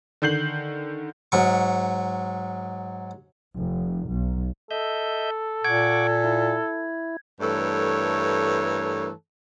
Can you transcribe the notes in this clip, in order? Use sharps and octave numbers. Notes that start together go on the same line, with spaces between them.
D3 D#3 G6 C7 F#7
G#2 F#3 C#6
F1
B1
A4 D#5 E5 G6
A#2 F#5 C#6 D6 G#6
E4
G2 E3 A3 A4 A#4 C#5